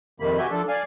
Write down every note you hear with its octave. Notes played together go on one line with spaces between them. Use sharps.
F2 C3 D#3 A#3 B5
F#4 G4 E5 G#5 G6
F3 D4 A4
D5 F5 G#5